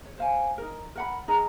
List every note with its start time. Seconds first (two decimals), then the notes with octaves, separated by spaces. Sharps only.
0.06 C#5
0.18 C5 F5 G#5
0.58 D#4 A#4
0.95 A#4 F#5 B5
1.28 D#4 G#4 A#4 B4